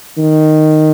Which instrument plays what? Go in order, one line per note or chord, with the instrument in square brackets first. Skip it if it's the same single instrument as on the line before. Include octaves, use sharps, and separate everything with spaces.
[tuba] D#3